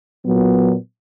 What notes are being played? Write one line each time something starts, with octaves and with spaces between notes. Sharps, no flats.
A#2 F#3 B3